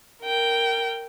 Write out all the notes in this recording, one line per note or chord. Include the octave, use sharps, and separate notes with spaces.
A#4 G5